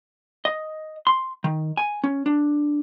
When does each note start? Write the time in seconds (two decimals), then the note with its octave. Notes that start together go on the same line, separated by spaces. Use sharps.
0.45 D#5
1.07 C6
1.44 D#3
1.77 G#5
2.04 C#4
2.26 D4